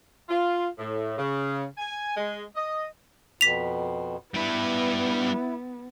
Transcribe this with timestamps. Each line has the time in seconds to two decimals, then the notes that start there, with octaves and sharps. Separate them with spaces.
0.29 F4
0.79 A2
1.18 C#3
1.77 G#5
2.16 G#3
2.56 D#5
3.41 F2 B2 B6 F7
4.35 G3 B3 E4 B4